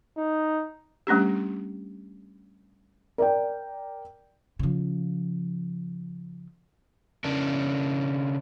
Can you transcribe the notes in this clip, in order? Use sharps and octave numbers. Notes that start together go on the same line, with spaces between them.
D#4
G3 A3 C#4 D4 G4
A#4 D5 G5
C#3 F3
C#3 C#4 D4 A#4